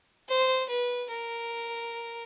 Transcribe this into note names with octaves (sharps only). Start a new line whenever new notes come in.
C5
B4
A#4